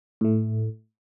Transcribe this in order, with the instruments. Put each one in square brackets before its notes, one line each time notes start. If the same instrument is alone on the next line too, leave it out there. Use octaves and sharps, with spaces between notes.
[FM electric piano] A2 A3